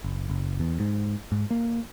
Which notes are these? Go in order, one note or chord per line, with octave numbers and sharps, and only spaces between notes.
F#1
F#1
E2
G#2
G#2
A#3